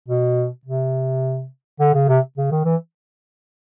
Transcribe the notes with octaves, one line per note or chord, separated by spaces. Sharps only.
B2
C3
D3
C#3
C3
C#3
D#3
E3